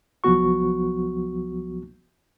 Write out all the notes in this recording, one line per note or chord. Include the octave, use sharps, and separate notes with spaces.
C2 F3 F#3 B3 F#4 C#6